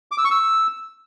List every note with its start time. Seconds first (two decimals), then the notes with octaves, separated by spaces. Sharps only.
0.11 D6
0.18 E6
0.24 C#6
0.31 E6